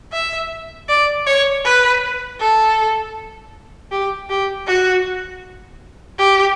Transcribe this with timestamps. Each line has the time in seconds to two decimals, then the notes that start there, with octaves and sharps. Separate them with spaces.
0.12 E5
0.89 D5
1.26 C#5
1.65 B4
2.40 A4
3.91 G4
4.30 G4
4.67 F#4
6.19 G4